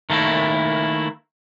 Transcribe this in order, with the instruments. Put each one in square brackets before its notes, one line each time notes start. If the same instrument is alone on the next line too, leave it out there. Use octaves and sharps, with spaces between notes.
[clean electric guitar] D#3 A3 A#3 E4